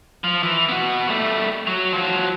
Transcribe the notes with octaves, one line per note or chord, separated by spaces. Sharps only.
F3
E3
B3 F#4
G3 A3
F#3
F3 F#3